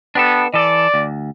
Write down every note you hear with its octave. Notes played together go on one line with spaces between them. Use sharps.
B3 D4 G4 A4
E3 A4 D5
D2